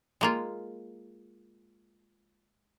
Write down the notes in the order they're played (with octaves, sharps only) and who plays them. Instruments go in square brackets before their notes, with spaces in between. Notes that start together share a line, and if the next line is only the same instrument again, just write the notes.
[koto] G#3 A#3 F4